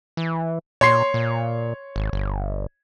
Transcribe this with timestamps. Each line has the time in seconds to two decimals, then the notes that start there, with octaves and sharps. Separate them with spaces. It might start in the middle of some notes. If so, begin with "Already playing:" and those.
0.17 E3
0.81 A#2 C#5 C6 C7
1.14 A#2
1.96 G#1
2.13 G1